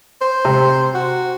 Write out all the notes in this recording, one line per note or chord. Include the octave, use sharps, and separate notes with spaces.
C5
C3
F#4